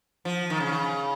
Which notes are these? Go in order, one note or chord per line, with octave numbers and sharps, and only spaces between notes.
F3
D#3
C#3